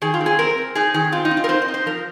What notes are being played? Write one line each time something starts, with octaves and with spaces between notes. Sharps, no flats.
D#3 G#4
F4
C4
G#4
C4 A#4
C4
D#4 G#4
D#3 G#4
C4 F4
D#4
C4
F4
A#4
C4 C5
D#5
D#4
C5
F3 A#4